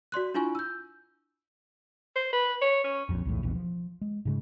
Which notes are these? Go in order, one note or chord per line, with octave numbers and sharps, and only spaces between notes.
F#4 D5 C6 F#6
D4 E4 F4 G#5 C#6
E6 G6
C5
B4
C#5
C#4
A#1 F2
B1 E2 A2
E1 A#1 E2 B2
F3
G#3
G#2 C#3 G#3